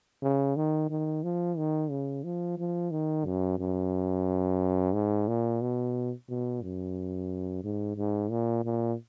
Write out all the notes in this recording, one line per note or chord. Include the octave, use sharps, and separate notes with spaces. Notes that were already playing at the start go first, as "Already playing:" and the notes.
C#3
D#3
D#3
F3
D#3
C#3
F3
F3
D#3
F#2
F#2
G#2
A#2
B2
B2
F#2
G#2
G#2
A#2
A#2